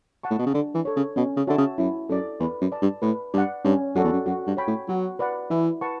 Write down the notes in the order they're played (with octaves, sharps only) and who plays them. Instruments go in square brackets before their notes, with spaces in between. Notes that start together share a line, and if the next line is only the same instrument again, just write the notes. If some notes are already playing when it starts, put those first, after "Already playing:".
[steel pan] F#5 A5 C#6
[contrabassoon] A2
B2
C#3
[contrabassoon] D3 [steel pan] D4
[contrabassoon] E3
[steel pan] A4 C#5
[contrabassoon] C#3
[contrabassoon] B2 [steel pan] C#4
[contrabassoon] C#3
[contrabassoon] D3 [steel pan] F#4 C#5 E5 A5
[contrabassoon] C#3
[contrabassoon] F#2 [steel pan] E4
[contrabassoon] F#2 [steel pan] A4 D5
[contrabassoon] E2 [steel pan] B4
[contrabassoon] F#2
[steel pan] D5 A5
[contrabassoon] G2
[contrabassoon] A2 [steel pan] B4
[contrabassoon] G2 [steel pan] D5 F#5
[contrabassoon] G2 [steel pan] C#4
[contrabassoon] F#2 [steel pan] F#4 A4 D5
[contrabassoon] E2
F#2
[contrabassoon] F#2 [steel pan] F#4
[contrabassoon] G2
[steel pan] C#5 G5 B5
[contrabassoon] A2
[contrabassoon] F#3 [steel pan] F#4
[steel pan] B4 D5 F#5
[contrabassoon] E3 [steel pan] E4
[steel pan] B4 F#5 A5 C#6